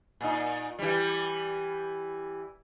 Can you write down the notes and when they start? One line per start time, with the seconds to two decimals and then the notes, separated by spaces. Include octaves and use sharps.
0.21 A#2 D#4
0.79 E3 G3